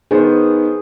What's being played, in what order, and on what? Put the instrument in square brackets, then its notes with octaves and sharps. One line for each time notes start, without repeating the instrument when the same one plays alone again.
[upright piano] D#3 B3 C5 [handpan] G#4